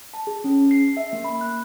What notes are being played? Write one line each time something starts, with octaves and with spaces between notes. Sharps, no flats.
A5
G#4
C#4
C7
E5
A#3
B5
F#6